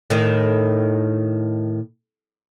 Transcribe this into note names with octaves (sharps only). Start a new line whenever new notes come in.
A2 D#3